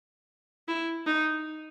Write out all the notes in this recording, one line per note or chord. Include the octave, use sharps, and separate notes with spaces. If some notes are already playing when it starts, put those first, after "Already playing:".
E4
D#4